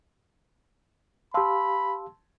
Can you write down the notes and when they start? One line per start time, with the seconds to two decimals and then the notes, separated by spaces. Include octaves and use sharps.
1.34 G4 F5 A5 B5 C6 E6